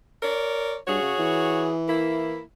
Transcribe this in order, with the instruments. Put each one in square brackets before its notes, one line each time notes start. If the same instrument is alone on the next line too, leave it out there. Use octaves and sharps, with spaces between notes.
[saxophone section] A#4 C#5 D5
[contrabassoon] G2 [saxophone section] F#4 G#4 C#5
[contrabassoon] C#3
E3
[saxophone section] A#3 E4